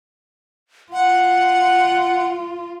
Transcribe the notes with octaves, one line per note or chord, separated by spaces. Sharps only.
F4 F#5